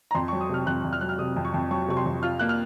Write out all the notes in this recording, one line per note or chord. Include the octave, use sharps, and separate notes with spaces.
A#5
F2 C6
F#3 C#6
D#6
C3 F6
F2 F#6
F2
F6
F#3 F#6
F6
C3 D#6
F2
C#6
F2
F#3 C#6
C3 C#6
C6
F2
F4 F6
A#3 F#6
F6